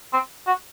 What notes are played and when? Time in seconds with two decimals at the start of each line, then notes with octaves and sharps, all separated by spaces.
0.13 C4
0.47 F#4